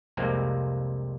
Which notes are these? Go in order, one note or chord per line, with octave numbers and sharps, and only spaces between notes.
C2 F2 C3 G#3 A#3 C4